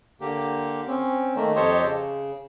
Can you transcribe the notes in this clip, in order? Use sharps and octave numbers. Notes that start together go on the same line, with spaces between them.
D3 A#3 G4
C4 C#4
D#3 A3 A#3
F2 G4 A4 C5 C#5 D#5
C#3